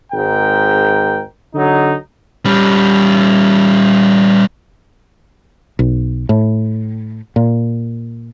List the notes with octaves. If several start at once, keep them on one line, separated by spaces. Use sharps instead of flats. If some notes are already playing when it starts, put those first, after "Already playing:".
G#1 G#2 A#4 G5
D3 F#3 D#4
G3 C#4
B1
A2
A#2